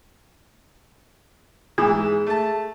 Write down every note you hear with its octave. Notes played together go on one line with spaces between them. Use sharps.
G#2 E3 G#4
A3 A5